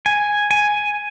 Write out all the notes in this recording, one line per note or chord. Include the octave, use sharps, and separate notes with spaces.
G#5
G#5